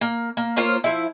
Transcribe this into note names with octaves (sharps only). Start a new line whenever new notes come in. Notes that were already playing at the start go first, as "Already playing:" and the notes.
A#3
A#3
A#3 F4 C5 C#5
F3 E4